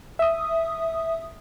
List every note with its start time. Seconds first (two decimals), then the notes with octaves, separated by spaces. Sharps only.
0.19 E5 D#6